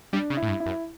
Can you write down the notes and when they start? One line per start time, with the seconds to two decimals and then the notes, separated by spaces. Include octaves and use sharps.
0.13 G3 D4
0.30 C#3
0.37 E4
0.42 A2
0.48 G2
0.60 E4
0.66 F#2